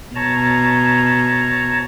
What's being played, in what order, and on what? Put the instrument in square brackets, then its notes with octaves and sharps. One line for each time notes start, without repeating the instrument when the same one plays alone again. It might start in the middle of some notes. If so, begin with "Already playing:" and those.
[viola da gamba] B2 [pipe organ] C#5 A5 A#5